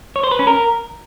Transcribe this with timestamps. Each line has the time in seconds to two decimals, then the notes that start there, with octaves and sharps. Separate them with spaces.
0.16 C#5
0.24 C5
0.31 B4
0.39 C#4
0.47 A#4